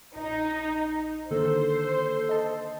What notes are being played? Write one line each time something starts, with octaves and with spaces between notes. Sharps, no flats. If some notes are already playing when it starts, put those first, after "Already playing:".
A#1 D#4
D3 D#3 A#3 A4 C5
D#5 A5